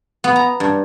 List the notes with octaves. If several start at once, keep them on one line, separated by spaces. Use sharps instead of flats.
B3
A#5
G2